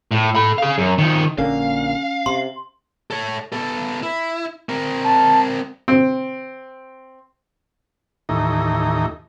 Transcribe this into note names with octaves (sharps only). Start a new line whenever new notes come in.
A2
A4 B5
G#4 F5
F#2
D#3 F3
A#1 D3 A#3 C#4 F5
C3 C6
A4 C#5
B3 A4
E4
C4 A#4
A5
C4
D#2 A2 E3 D#4 A#5